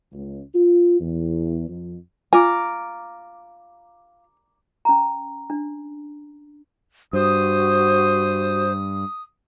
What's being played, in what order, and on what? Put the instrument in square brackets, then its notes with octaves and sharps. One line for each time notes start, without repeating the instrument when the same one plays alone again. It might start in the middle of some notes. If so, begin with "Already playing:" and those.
[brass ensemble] C#2
F4
E2
F2
[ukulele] F4 [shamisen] G#5 [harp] A#5 D6
[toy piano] C#4 A#5
D4
[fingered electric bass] G2 [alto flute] F#4 [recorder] C5 [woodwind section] D#6